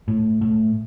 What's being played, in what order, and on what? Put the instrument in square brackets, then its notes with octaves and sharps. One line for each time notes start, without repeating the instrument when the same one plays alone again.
[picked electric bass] A2
A2